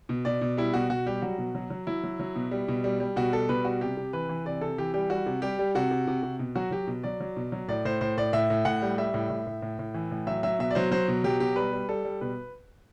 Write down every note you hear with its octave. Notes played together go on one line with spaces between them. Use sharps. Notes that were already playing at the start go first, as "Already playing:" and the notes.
B2
B2 D5
B2
G3 E4
B2 F#4
B2 F#4
G3 G4
F#3 F#4
B2
F#3
F#3
F#3 E4
F#3
F#3
B2
G3
B2
G3
G3
B2 F#4
G3 A4
B2 B4
G3 F#4
C3 G4
C3
E3 B4
E3
C3 D5
C3 A4
E3 G4
G3 G4
G3 F#4
C3
G3 G4
G3
C3 F#4
C3
C3
C3
B2
F#3 F#4
F#3 G4
B2
F#3 D5
F#3
B2
F#3
A2 D5
A2 C5
A2 C5
A2 D5
A2 E5
A2
A2 F#5
G3
G3 E5
A2
A2
A2
A2
A2
E3
A2
F#3 E5
F#3 E5
B2 E5
D5
F#3 C5
F#3 C5
B2
F#3 G4
B2 G4
G3 B4
G3
G3 A4
G3
B2 B4